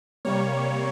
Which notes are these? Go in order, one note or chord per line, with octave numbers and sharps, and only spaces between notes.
C3 G3 A#3 C#5